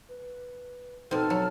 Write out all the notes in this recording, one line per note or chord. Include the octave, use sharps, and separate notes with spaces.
B4
B2 C4 D#4 A4 F6
F#3